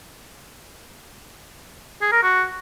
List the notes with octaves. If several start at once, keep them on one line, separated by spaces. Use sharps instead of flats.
G#4
A#4
F#4